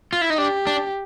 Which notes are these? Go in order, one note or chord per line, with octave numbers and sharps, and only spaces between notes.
F4
E4
D#4
D4 G4
D4